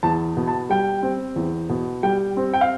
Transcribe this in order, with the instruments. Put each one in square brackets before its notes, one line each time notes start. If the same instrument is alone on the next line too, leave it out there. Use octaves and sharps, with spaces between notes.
[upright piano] E2 A5
B2
A5
G3 G5
C4
E2
B2
G3 G5
C4
G5
F5